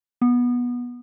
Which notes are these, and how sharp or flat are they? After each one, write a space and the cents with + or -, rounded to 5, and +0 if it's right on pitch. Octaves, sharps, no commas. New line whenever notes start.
B3 -15